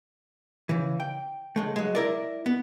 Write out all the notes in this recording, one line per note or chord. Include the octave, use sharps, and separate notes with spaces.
C#3 E3
G5
C#2 G#3 A3
F#3 G#3
E4 A#4 D5
B3